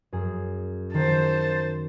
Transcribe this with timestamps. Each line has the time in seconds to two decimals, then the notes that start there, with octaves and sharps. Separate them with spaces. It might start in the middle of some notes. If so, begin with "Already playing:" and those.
0.13 F#2 G#4
0.94 D#3 C5 A5